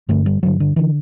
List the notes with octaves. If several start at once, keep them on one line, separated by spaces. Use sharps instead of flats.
G2 D3 A3
G3
G2 D3 F#3
D3
D3 E3